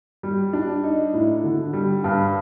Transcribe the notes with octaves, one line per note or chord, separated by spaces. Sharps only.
G3
D4
D#4
A2
D3
G3
G2